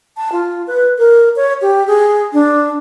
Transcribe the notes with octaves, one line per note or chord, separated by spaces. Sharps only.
A5
F4
B4
A#4
C#5
G4
G#4
D4